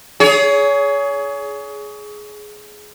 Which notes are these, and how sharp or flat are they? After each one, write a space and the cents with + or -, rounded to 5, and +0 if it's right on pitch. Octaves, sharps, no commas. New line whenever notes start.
G#4 +15 C#5 +30